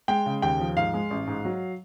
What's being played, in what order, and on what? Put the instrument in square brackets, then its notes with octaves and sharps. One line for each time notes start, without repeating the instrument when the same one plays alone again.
[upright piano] G#3 G5
C#3
D#2 G5
F3
G#2 F5
G#3
A1
G#2
F#3